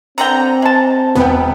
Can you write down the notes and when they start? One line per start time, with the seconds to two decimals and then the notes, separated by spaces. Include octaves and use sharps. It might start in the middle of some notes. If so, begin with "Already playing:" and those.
0.18 D3 C4 D5 G5 A#5
0.62 G#3 A5
1.15 E1 B3 G5